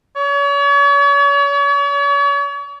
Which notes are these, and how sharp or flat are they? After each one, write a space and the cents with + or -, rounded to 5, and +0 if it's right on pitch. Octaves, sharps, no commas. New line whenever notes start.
C#5 +40